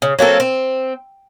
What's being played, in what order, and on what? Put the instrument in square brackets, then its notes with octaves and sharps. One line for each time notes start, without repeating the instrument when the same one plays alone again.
[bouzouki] C#3
F#3 A#3 C4 A4
C4